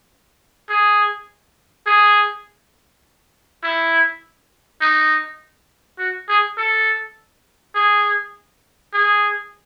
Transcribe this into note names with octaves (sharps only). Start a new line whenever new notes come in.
G#4
G#4
E4
D#4
F#4
G#4
A4
G#4
G#4